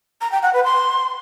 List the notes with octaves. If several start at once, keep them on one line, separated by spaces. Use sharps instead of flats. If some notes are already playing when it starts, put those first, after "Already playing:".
A#5
G5
F#5
B4
C6